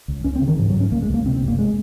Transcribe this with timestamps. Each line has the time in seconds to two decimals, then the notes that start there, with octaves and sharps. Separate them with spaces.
0.08 C#2
0.24 C#2 C#4
0.36 C4
0.42 C#3
0.48 D#3
0.59 G#2 F3
0.70 F#3
0.75 G#2
0.80 C#4
0.92 C#2 A#3
1.02 G#3
1.09 C#2 A#3
1.25 C3 C4
1.36 C4
1.42 F#1
1.48 A#3
1.59 G#3